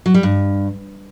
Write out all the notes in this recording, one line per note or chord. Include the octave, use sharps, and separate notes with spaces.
F#3
G3
G2